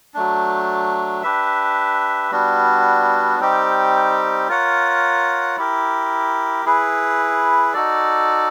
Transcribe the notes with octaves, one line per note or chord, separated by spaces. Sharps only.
F#3 A3 D4
D4 G4 B4 E5
G3 B3 D4 F#4
G3 C4 D#4 G4
F4 A#4 C#5 F#5
E4 G4 A#4
E4 G#4 B4
D#4 F#4 A4 D5